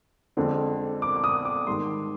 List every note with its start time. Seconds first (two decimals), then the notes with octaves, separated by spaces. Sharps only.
0.37 F2 D3 G#3 C4
1.02 D6
1.16 D6
1.24 D#6
1.45 D6
1.67 G#2 D#3 G3 C6